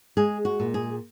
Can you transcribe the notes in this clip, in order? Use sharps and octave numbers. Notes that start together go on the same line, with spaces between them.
G#3 G#4
F#4
A#2
G#4